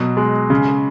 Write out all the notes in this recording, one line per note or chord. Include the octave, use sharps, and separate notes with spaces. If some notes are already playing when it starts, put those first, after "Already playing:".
Already playing: B2 F#3
G#3
C#3